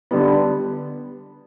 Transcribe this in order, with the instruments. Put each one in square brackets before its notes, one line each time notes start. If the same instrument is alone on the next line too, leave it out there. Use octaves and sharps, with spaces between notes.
[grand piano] D3 G3 B3